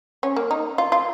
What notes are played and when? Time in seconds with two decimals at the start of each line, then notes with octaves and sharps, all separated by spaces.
0.23 C#4
0.36 A#3
0.51 D#4
0.78 F4
0.92 F4